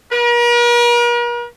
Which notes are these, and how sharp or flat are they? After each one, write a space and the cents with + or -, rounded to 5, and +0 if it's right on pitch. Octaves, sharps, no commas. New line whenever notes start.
A#4 +45